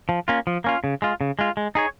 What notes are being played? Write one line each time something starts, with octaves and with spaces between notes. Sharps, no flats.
F3
A#3 C#4 F4
F3
A#3 C#4 F4
C#3
G#3 F4
C#3
G#3 F4
G#3
D#4 G#4 C#5